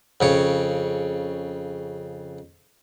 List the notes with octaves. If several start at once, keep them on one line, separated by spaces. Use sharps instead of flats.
F2 C#3 C#5